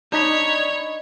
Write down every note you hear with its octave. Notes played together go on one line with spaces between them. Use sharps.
D4 D#4 C#5 B5